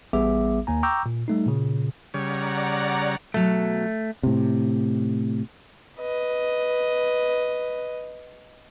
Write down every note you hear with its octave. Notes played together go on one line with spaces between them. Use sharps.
A1 G3 B3 G#4 E5 D6
D#2 A#3 G#5 A#5
G5 A#5 C#6 D6 E6 G6
A#2
G3 A3 D#4
A#2 C#3
C#3 G3 C#5 D5 F#5 A#5
B2 F#3 A3
A2 C3
B4 D#5